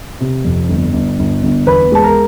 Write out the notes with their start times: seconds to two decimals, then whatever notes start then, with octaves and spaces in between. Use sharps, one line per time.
0.20 C3
0.45 F2
0.69 G1
0.93 G1
1.19 G1
1.43 G1
1.67 E2 B4 B5
1.92 G#3 A5
2.03 A#4 A#5